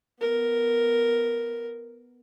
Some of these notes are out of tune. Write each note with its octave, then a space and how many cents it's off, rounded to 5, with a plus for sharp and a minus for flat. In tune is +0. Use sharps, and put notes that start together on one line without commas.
B3 +0 A#4 +0